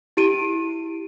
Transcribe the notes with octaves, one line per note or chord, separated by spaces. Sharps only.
E4 G4 D7 D#7